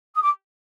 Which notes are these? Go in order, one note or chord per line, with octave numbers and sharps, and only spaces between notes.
D#6
D6